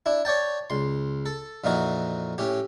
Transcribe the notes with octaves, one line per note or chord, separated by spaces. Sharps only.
D4 E4
C#5 D5 G5 A5
C#2 C6
A4
F2 A#2 E3 D#4 F#4
A2 C#4 G4